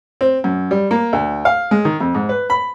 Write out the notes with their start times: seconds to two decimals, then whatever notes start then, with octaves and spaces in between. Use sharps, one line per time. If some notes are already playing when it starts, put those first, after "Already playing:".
0.21 C4
0.44 F#2
0.71 G3
0.91 A#3
1.13 D2
1.45 F5
1.71 G#3
1.85 D#3
2.00 F2
2.15 G#2
2.29 B4
2.50 B5